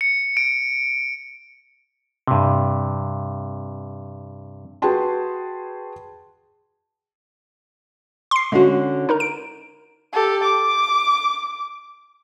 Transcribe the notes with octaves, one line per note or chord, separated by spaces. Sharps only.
C#7
D7
G2 C3
F#4 G#4 B4 G5 A5 C6
C6 C7
D3 G#3 C#4 F#4
D#4 A#4 A#5
D7
G4 A4
D6